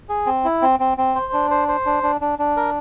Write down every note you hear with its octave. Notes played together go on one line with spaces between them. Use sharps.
G#4
C4
E4
C4
C4
C4
C5
D4
C5
C5
D4
D4
D4
D4
A#4